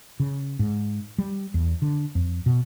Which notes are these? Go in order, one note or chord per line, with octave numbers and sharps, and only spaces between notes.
C#3
G#2
G3
E2
D3
F2
B2